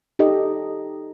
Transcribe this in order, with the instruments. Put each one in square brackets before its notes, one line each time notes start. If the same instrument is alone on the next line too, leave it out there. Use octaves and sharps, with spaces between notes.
[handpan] D#4 G4 A4 D#5